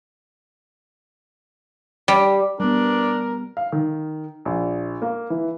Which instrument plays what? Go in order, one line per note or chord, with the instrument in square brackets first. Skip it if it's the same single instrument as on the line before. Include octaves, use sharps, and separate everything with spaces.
[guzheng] G3
[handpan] G3 B3 [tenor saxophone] D4 [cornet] A#4
[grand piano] F5
D#3
A#1
A#3
E3